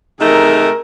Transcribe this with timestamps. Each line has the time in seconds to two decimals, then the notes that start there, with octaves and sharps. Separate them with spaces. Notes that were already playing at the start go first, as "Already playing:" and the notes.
0.20 C3 A3 D#4 G#4 A#4